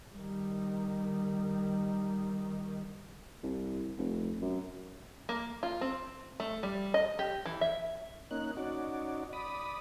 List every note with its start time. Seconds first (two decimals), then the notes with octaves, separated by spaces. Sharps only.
0.13 D#3 G3
3.43 C2
3.98 F1
4.41 F#2
5.29 A#3
5.63 F4
5.81 C4
6.40 A3
6.63 G3
6.94 D#5
7.19 G4
7.45 E3
7.61 E5
8.31 A#3 C#4 D#4 F#6
8.57 C#4 D#4 F#4 D5
9.33 D5 B5 D#6